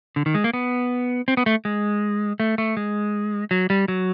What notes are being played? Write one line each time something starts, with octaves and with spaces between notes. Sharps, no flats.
D3
D#3
G#3
A#3
B3
C4
B3
A3
G#3
A3
A3
G#3
F#3
G3
F#3